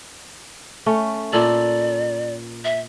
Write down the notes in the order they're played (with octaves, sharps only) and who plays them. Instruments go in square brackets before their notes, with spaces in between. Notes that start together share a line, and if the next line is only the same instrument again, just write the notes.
[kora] A3 C#4
[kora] A#2 A4 [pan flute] D5
[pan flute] E5